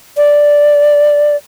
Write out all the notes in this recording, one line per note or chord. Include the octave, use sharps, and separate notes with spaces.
D5